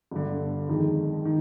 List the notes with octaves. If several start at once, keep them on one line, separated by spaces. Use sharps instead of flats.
G1 G2 D3
F2 D#3 G#3
D#3